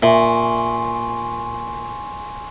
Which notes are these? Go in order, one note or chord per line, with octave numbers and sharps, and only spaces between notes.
A#2 E5 G#5 C6 C#6